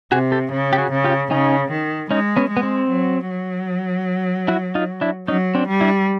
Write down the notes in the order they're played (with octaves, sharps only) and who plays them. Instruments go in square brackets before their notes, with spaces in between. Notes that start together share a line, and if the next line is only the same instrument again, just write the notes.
[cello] C3 [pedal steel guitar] F#4 G#4
[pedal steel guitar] G4 A4
[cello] C#3
[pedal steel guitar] G4
F#4 G#4
[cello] C#3
[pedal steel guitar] F4 G4
[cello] C#3 [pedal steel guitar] C#4 D#4
[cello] D#3
[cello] G#3 [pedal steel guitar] C#4 D#4
[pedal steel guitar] B3 C#4
[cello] G#3
[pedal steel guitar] B3
C4
[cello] F#3
F#3
[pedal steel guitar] E4 F#4
D#4 F4
D4 E4
[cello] F#3 [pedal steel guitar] C#4 D#4
[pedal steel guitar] C4 D4
[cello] G3
[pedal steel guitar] D4 E4